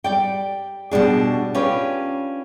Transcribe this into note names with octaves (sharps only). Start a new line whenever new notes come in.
G3 D5 G5
B2 G3 D4 G#4
C#4 D4 F4 G4 B4 D5